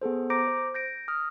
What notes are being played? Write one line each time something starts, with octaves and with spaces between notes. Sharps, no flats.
B3 G#4 A4 C5
C5 A#5 D6 G6 A#6 D7
C5
G6 A#6 D7
D#6 F6